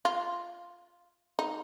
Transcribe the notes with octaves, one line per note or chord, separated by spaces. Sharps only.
F4
D#4